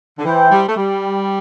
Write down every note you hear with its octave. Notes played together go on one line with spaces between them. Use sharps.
D3
E3 E4 C5 G5
G3
A3
G3